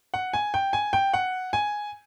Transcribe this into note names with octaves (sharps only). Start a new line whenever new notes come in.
F#5
G#5
G5
G#5
G5
F#5
G#5